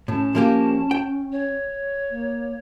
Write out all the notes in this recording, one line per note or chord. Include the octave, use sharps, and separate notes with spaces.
A2 C#4 A5
F3 A#3 G4
G5
C#5
A#3